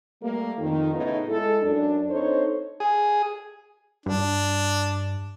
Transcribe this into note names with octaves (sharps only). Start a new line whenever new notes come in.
G3 A3 A#3
F2 D#3
A2 C#3 B3 D#4
G#3 E4 A4
F#2 D4
C4 D4 D#4 A4 C5 C#5
G#4
G2 D4